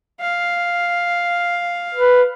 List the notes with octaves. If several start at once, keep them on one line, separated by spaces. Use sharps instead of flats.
F5
B4